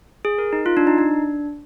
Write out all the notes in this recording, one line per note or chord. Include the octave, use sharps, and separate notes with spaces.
G#4
A#4
D#4
F4
D4
D#4
D4